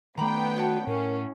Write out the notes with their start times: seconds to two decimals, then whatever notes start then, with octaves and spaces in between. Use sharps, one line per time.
0.18 D#3 A3 B3 G5 A#5 B5 D6
0.56 F#4 C#5 F#5 A5
0.87 A2 C#4 A#4